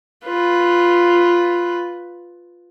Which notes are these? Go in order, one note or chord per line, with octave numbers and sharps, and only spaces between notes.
F4 B4